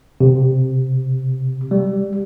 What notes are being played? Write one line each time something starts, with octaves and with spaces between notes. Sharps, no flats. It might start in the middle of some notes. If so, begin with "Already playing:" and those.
C3
G3